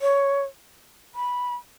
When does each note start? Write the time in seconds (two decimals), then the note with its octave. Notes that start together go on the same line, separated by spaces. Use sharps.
0.01 C#5
1.15 B5